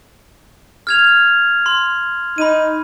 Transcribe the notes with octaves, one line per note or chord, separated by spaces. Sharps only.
F6 G#6 F7
C6
D#4 B5 D#7